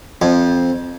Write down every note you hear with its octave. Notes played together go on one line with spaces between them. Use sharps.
F2